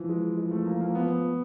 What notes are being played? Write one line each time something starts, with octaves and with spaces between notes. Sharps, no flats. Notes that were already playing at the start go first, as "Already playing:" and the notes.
Already playing: E3 F3
G#3
G#3
A3
A#3
A#3
B3